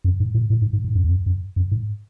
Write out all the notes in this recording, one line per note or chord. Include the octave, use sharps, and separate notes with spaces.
F#2
G#2
A2
A2
G#2
G#2
G#2
F#2
E2
F#2
F#2
F#2
G#2